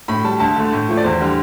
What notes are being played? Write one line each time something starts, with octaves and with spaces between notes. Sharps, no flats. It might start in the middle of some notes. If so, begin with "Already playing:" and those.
A2 B5
G3 A5
D2 A5
D3 A3
A2
F3 A3
D5
E2 C5
D3 G3